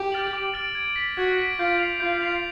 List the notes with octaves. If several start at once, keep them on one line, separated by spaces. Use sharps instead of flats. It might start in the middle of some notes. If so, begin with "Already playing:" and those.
Already playing: G4
F6 A6 D7 F#7
D6
F6 A6 D7 F#7
G#6
B6 D7
F#4 G#6
B6 D7
F4 G6
C7 F7
F4 G6
C7 F7